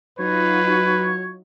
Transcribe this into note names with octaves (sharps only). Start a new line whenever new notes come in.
F#3 D#4 F4 F#4 B4 C#5